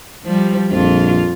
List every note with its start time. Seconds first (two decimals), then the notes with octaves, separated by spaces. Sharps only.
0.25 F3 G3
0.71 A#1 F2 F4